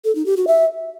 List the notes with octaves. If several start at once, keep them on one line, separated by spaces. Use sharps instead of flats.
A4
D#4
G4
F#4
E5